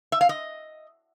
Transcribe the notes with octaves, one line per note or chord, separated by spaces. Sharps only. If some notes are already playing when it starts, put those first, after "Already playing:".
E5
F5
D#5